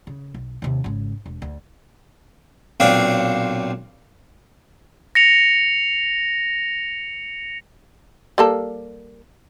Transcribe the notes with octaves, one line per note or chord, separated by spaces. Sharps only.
C#3
B1
D#2 C3
G#1 C#3
E1
D2
B1 A#2 C4 D4 C#5 F5
A#6 C#7 F7
G3 A#3 A4